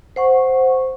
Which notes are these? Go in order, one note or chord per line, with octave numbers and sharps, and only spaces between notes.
C5 F#5 C#6